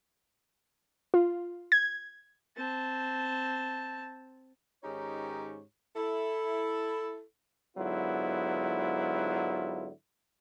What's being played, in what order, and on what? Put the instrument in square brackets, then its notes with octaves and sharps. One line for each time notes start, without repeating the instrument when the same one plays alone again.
[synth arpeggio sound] F4
G#6
[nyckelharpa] C4 A5
[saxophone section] G#2 D#3 C#4 D#4 G4 C#5
E4 A4
[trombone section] G#2 D3 F#3 B3 E4 F4